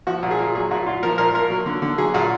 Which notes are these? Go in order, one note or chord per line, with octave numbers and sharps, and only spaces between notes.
F3 F#4
A#2
G#4
A#2
F#3 G#4
A#2 F#4
A#2 F4
F3 A#4
A#2 A#4
A#2 A#4
F#3
D3
D3
F#3 G#4
A#2 F#4